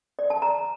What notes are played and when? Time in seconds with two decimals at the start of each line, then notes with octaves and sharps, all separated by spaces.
0.19 D5
0.30 A5
0.42 A#5